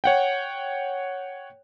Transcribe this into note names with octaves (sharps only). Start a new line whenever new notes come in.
C#5 F#5 G5